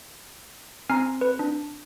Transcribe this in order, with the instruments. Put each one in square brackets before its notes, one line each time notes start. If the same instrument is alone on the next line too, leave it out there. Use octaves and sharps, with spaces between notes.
[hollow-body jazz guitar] C4 A#5 [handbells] G#5 F6 C7
[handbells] B4
D4